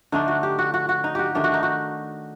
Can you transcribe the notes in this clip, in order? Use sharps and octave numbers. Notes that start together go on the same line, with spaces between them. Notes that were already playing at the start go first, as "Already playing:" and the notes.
D3 A3 D4 D#4
F#4
G4
F#4
F#4
F#4
D#4
F#4 G4
D#3 A3 D4 G4
F#4
D#4
F#4